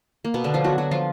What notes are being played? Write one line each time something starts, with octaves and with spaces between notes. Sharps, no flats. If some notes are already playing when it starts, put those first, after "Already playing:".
A#3
B2 B3
D3 D4
F3 F4
F#3 F#4
F#3 F#4
F3 F4